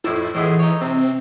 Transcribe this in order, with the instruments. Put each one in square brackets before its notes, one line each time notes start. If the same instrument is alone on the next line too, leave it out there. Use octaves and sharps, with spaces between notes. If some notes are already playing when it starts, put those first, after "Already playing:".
[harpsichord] F2 A2 A5 [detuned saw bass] E4
[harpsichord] A2 G#3 B3 [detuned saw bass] E3
[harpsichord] D#4 C#5
[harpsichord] C3 [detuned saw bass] C4